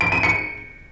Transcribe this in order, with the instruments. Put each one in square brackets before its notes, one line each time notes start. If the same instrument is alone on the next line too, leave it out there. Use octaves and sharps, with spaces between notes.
[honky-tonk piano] D7
D#7
C#7